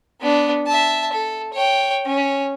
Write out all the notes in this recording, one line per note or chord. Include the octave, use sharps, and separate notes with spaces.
B3 D4
E5 A5
A4
C#5 G5
C#4